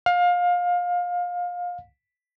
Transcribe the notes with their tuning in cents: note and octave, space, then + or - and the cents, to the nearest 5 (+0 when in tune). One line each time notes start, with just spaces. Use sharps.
F5 +25